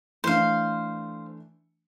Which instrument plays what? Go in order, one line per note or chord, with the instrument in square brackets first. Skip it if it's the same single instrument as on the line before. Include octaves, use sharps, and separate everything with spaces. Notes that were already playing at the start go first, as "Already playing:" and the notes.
[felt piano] E3 A3 D4 [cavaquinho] C5 F5